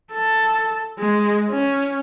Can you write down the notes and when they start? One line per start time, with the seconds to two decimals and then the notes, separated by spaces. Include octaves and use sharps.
0.13 A4
0.99 G#3
1.51 C#4